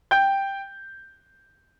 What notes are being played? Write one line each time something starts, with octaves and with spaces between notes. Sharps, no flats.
G5 G6